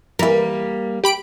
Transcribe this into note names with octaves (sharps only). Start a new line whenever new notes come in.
E3 G3 A#3 A#4
G4 B5 D7